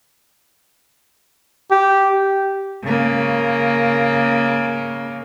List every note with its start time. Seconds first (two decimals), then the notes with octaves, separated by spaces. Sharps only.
1.71 G4
2.84 C#3 A#3